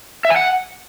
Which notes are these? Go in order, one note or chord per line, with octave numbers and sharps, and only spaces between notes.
E5
G#5
F#5